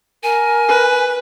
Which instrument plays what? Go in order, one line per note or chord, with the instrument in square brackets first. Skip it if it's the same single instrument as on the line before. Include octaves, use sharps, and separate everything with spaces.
[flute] A#4 [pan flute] G#5
[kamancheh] B4